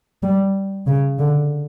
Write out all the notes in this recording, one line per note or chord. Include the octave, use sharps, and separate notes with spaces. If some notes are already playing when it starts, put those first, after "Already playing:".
G3
C#3
D3